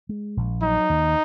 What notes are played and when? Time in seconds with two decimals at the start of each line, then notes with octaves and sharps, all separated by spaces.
0.09 G#3
0.37 A#1
0.62 F#3 D#4
0.90 D#2